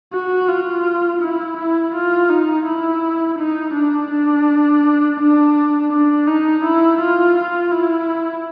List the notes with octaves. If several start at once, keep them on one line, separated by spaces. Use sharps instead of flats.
F#4
F4
E4
E4
F4
D#4
E4
D#4
D4
D4
D4
D4
D#4
E4
F4
F4
E4